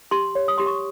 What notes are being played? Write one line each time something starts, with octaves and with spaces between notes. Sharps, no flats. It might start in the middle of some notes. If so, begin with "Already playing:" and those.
G4 C6
C#5
D#6
G4 C6
C#6